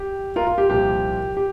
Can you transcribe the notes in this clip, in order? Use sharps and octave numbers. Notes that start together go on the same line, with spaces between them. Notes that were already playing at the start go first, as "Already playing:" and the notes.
Already playing: G4
F4 A#4
F4
G4
C2 A#2 F3 A#3 G4
G4